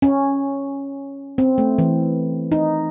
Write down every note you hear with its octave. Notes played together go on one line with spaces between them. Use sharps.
C#4
C4
A3
E3
D#4